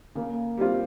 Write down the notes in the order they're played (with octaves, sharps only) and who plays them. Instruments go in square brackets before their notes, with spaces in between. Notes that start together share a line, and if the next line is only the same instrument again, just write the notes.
[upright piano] C#3 [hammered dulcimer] A#3
[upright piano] G3 C4 F4